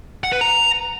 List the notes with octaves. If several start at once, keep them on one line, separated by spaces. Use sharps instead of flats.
F#5
B4
A#5